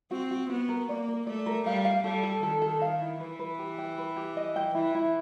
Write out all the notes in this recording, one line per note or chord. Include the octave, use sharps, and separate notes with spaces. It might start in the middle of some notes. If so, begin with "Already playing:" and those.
C4 F#4
F#4
B3 F#4
A#4
A#3 D5
A#4
A3 D5
A#4
G3 F5
F5
G3 A4
A4
D#3 A4
A4
F5
E4
E3 B4
B4
G4
G5
B4
G4
D#5
G5
E3 E4
E4